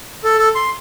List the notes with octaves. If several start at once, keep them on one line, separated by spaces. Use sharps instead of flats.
A4
A4
C6